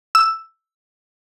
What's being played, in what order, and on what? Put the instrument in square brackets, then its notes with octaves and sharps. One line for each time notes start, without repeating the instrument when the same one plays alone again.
[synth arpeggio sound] E6